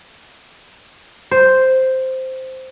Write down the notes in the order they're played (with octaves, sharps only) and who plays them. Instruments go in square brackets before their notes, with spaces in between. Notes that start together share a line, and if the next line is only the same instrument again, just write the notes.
[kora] C5